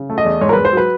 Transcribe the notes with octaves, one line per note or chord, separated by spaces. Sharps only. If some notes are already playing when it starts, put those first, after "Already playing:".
Already playing: C#3
A3
D#5
E2
G#2 C#5
A#4
G#2 B4
C5
F#3 B4